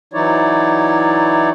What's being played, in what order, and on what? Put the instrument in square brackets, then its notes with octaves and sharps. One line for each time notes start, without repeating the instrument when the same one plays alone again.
[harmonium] E3 F#3 D#4 E4 C#5 D5